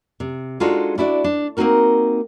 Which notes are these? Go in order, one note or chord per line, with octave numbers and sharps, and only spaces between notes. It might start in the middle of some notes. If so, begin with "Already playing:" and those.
C3
G#3 D4 D#4 F4 F#4 A4
D4 E4 F#4 D5
D4
A#3 C4 C#4 D#4 F#4 A#4